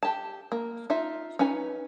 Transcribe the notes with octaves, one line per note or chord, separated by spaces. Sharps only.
G4 A5
A#3
D#4 F4 E5
C#4 D#4 B4 G#5